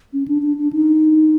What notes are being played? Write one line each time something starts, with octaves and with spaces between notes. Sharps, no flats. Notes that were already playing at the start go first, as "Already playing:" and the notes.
C#4
D4
D4
D4
D#4